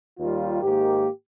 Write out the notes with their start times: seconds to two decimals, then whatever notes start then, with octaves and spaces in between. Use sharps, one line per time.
0.19 D#2 D#3 G3 F4
0.62 G#2 D#3 A#3 G4